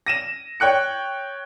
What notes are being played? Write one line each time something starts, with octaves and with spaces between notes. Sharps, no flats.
A#6 D#7 E7
C#5 G5 F#6 C#7